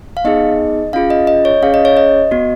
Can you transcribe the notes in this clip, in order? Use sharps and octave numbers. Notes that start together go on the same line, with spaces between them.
F5
B3 D#4 G#4 D#5
C#4 F4 G#4 F5
D#5
D#5
C#5
C#4 G#4 F5
D#5
C#5
D#5
B3 F#4